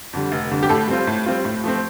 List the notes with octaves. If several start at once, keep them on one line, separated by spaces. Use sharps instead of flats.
F2 D3 G3
F1
F2 D3 G3
G4
A2 A4
G3 C4 F4
A2
G3 C4 F4
A2
F3 A3 C4